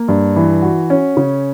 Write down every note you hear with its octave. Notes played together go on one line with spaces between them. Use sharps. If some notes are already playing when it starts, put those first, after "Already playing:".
Already playing: A#3
G2
E3
F#4
C#4
C#3